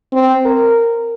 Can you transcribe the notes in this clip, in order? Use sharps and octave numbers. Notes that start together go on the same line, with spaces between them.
C4
A#4